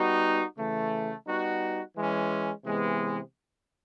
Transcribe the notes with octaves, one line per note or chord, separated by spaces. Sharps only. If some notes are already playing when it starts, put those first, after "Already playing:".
Already playing: G3 B3 D#4 F#4
C#3 E3 A3
G3 B3 D#4 F#4
E3 G#3 C#4
C3 E3 G#3 B3